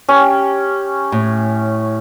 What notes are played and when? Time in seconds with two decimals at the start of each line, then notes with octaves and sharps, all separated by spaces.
0.09 C#4 G4
1.12 A2